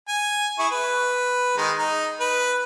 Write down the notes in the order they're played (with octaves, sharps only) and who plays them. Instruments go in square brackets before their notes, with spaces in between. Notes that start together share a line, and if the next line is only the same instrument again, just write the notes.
[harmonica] G#5
E4 G#4 C#6
B4
D#3 G#3 D#4
D#4
B4